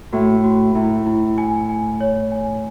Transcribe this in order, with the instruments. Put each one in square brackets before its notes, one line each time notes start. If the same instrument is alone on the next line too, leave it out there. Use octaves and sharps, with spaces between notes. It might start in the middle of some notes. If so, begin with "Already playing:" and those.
[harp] A2 [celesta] F#4
[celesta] F#4
[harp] A2 [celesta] E4
[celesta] E4
G#5
G#5
C#5
G#5